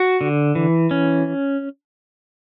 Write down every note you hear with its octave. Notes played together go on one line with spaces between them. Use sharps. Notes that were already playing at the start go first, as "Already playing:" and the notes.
Already playing: F#4
D3
E3
C#4